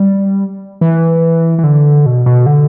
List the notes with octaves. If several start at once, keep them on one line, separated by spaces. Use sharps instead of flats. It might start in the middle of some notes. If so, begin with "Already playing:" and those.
Already playing: G3
E3
E3
D3
B2
B2
D3